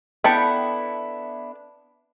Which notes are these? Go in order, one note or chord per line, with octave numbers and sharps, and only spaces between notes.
B3 D4 E4 A4 G5 B5